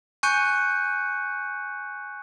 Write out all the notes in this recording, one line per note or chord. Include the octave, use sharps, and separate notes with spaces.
G#5 C#6 F#6 G6 C#7 D#7